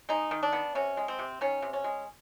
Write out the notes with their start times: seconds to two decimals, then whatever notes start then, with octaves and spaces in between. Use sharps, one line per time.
0.09 G#3 D#4
0.31 D#3
0.43 D4
0.53 B3
0.75 C3 C#4
0.97 G#3
1.08 C4
1.19 C3
1.41 D#3 C#4
1.62 C3
1.73 C#4
1.84 G#3